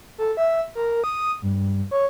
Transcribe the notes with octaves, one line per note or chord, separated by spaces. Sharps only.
A4
E5
A#4
D#6
G2
C#5